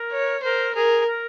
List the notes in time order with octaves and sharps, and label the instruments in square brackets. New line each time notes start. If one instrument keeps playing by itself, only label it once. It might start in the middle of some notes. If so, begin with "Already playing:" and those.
Already playing: [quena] A#4
[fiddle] C#5
[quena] A#4 [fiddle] C5
[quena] G#4 [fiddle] A#4
[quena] A#4